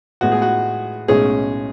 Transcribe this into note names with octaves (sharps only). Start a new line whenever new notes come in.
A2 G#3 B3 F#4
G#4
F#4
B1 A2 G#3 C#4 G#4